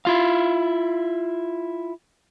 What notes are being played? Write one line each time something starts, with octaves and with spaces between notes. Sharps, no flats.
E4 F4 F5